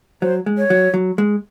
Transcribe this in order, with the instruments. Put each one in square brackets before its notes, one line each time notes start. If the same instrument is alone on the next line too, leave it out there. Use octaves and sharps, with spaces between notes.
[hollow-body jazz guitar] F#3 [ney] C5
[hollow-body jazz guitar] G#3
[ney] C#5
[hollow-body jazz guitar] F#3
F#3
G#3